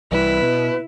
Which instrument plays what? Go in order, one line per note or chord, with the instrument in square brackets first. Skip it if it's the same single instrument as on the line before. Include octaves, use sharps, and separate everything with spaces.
[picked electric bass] C2 E3 G3 [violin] E4 [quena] B4
[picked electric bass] B2